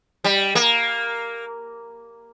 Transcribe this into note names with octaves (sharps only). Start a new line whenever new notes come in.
G3
A#3